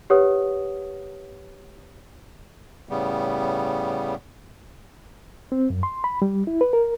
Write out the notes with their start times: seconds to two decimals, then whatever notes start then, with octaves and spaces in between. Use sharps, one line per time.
0.10 G4 B4 C#5 F#5 D#6
2.89 A2 C#3 G3 B3
5.52 C4
5.70 F#2
5.83 C6
6.04 B5
6.22 G3
6.47 E4
6.61 B4
6.73 A#4